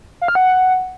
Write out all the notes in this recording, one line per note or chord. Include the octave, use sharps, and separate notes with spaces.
F5
F6
F#5